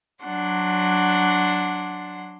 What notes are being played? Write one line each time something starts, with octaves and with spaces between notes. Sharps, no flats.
F#3 D4 F#5 C6